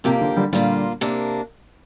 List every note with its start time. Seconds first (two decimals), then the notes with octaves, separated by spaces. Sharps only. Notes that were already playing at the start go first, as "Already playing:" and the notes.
0.04 F2 C3 F3 A#3 G4
0.21 D3
0.36 D3 G3
0.52 A#2 D3 G3 A#3 F4
1.01 C3 A#3 D4